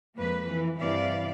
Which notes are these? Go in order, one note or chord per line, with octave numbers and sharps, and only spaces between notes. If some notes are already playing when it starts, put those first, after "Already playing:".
F2 G#3 A#3 B4
E3
G2 C3 E3 E4 D5 F5